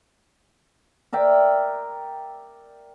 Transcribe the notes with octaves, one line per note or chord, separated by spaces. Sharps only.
A#4 D5 E5 G5